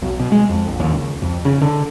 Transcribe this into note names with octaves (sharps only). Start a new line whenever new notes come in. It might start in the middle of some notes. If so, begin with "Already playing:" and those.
B1
B2
G#3
F2
A#1
D#2
C#2
F2
C#3
D3